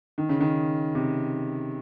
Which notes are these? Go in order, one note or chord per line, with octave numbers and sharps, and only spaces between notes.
D#3
C#3
D#3
C3